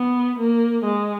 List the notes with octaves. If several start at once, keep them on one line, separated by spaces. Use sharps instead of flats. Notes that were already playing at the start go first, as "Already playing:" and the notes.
Already playing: B3
A#3
G#3